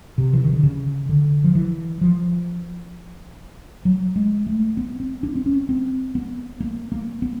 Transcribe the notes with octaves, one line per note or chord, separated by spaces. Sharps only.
C3
E3
D#3
D3
C#3
D3
F3
E3
F3
F#3
G#3
A3
B3
C4
D4
C4
C#4
C4
B3
A#3
A#3
B3